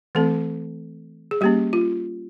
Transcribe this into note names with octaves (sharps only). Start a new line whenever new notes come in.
E3 A3 C4 A4
G#4
G3 A#3 C#4 G4
F4